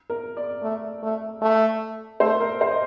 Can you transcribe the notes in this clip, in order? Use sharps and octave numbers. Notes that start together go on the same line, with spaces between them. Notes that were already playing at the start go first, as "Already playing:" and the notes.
A#4
D5
A3
A3
A3
A3 C5
A#4
C5
D#5